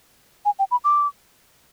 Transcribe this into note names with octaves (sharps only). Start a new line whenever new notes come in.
G#5
G5
B5
D6